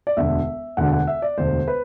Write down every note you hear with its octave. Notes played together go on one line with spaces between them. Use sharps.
D5
E1 D2 D3 E5
E1 D2 D3 F#5
F#5
E5
D5
E1 D2 D3 C5
B4